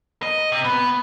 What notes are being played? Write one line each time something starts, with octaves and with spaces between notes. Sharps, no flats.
D#5
C3
B3